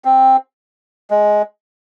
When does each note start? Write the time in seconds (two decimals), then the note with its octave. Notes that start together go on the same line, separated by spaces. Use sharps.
0.05 C4
1.10 G#3